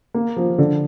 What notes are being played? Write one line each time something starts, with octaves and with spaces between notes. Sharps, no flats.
A#3
F3
D3